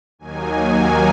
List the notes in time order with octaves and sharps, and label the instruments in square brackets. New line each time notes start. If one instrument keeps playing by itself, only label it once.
[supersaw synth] D#2 D#3 F#3 A#3 D#4 G#5